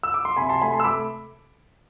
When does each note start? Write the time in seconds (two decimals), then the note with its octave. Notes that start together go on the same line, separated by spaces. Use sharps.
0.03 E6
0.14 D6
0.25 C6
0.36 C3 G#5 B5
0.49 A5 C6
0.62 A3 G#5 B5
0.73 A5 C6
0.80 E6
0.85 A3 B5 D6